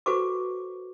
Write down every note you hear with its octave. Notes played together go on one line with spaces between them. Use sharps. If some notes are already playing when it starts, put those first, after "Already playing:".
F#4 A4 B4 C5 C#6 D6